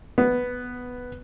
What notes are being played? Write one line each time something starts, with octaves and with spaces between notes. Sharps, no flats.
B3